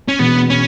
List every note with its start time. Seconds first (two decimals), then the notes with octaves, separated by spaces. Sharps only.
0.08 C#4
0.19 E1 E2 B2 B3
0.50 C#4